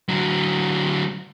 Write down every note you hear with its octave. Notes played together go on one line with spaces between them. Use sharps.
D3 F#3